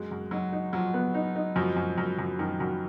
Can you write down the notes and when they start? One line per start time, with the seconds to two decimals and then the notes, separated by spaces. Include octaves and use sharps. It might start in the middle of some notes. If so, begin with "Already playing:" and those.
Already playing: F#2 G#3
0.11 F#2
0.31 F#3 D#4
0.52 D#4
0.73 F3 F#3
0.94 B3
1.14 D#4
1.36 D#4
1.56 F#2 F3
1.77 F#2
1.98 F#2
2.19 F#2
2.39 F#2 D#3
2.60 F#2